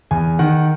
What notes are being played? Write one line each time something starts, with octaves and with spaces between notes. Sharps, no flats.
E2 G#5
D#3 F#5